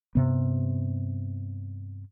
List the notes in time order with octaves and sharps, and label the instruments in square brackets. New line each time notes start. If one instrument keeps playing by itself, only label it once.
[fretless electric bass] G2 C3 B3